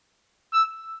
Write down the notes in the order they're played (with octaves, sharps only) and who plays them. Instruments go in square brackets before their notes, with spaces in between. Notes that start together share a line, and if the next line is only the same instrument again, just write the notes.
[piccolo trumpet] E6